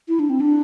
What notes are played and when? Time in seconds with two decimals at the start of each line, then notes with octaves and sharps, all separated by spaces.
0.08 E4
0.19 D4
0.30 C4
0.41 D4